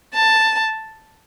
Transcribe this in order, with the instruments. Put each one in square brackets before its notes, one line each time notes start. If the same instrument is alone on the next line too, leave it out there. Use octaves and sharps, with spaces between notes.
[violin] A5